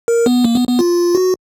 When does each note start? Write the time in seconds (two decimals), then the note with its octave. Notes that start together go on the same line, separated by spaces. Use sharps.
0.08 A#4
0.26 B3
0.44 A#3
0.55 B3
0.68 B3
0.79 F4
1.15 F#4